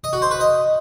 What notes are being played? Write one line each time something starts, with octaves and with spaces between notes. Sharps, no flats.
D#5
F#4
C5
B4
D#5